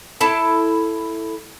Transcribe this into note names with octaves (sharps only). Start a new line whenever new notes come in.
E4 A4 A5